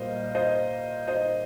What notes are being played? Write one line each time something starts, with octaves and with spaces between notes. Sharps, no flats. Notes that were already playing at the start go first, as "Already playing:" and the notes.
Already playing: A#2 G3 A#3 C5 D#5
C5 D#5
C5 D#5